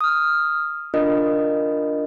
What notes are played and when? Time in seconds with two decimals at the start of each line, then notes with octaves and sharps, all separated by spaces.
0.01 D#6 F6
0.94 D4 F4 A#4 D#5